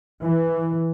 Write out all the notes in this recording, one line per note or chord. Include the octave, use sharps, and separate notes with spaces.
E3